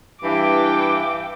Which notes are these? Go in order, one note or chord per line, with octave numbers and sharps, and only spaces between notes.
G2 E3 G5 D6